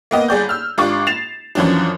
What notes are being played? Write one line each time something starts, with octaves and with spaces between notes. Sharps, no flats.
A#3 B3 D#5
G1 G#4 D5 G6
E6 F6
G#1 D4 F4 G4 C#6 D6
A6 C7 E7 F7
F#2 E3 F3 C#4 D4